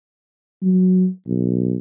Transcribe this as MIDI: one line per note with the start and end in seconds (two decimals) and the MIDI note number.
0.63 1.08 54
1.27 1.77 35